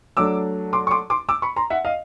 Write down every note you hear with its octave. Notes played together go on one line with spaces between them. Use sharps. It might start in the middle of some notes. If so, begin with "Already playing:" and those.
F#3 A3 D4 D6 E6
C6 D6
C#6
C6 D6
C6 D6
D6 E6
B5 C#6
A#5 C6
E5 F#5
D#5 F5